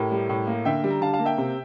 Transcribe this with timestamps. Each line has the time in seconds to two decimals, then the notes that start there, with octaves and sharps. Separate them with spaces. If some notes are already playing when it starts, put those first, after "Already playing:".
Already playing: A2 G4 A#4
0.12 G3
0.29 A2
0.47 A#3
0.65 D3 E5 G5
0.84 G3
0.91 A#5
1.01 D3 F5 A5
1.13 F5 A5
1.19 A#3
1.25 E5 G5
1.38 C3